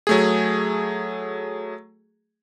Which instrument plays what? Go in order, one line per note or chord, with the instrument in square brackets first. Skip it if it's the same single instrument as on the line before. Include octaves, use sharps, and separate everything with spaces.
[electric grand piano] F#3 A3 G#4